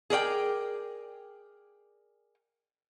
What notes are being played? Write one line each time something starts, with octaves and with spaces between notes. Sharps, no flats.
G#4 A#4 D5 G5